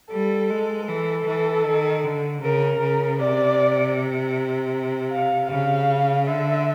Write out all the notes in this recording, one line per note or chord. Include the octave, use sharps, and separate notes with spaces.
G3 A4
G#3
E3 A4
E3
D#3
D3
C#3 A#4
C#3
C3 D5
F5
C#3 F5
D3 E5